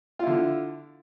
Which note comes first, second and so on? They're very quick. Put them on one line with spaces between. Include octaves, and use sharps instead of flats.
F4 E4 D3